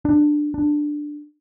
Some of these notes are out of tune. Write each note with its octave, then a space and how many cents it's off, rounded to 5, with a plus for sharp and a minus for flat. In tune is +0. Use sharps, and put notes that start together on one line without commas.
D4 +15
D4 +10